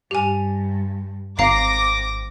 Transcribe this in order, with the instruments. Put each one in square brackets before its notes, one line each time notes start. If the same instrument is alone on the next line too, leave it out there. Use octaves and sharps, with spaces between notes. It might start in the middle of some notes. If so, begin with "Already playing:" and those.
[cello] G2 [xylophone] G4 G#5
[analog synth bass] G#1 [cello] C4 [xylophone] F5 A#5 C7 [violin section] D6 A#6